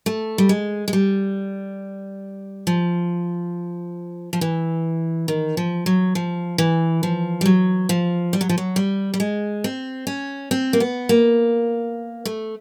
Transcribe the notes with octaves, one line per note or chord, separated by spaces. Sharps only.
A3
G3
G#3
G#3
G3
F3
F3
E3
D#3
F3
F#3
F3
E3
F3
G3
F#3
F3
G3
F#3
F3
F#3
G3
G3
G#3
C4
C#4
C4
A#3
B3
A#3
A3